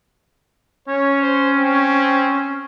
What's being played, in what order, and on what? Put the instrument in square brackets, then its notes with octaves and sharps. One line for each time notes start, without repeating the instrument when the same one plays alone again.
[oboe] C#4 [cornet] C#5
[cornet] C5
C4